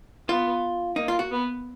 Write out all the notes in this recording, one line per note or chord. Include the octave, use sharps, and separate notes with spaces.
B3 F4
A#3 D#4
F4
F#4
B3